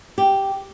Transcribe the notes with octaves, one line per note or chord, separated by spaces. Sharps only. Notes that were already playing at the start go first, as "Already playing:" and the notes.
G4